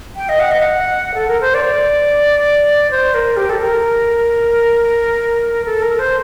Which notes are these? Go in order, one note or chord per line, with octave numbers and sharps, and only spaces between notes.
G5
D#5
F#5
D#5
F#5
A4
A#4
C5
D5
C5
A#4
G4
A4
A#4
A4
A#4
C5